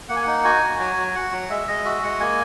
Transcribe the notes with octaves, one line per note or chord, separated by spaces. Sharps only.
A#3 F#5
G#5
D#4 F#5
F#4 G#5
F#4
F#3 G#5
F#3
F#4 F#5
F#3
G#3 E5
G#3 D#5
F#4 E5
G#3 F#5
A#3 G#5